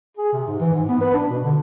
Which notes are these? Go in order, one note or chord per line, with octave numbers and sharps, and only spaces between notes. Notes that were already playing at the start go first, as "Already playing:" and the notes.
G#4
C3
G#2
E3
G#2
B3
B4
D4
B2
D3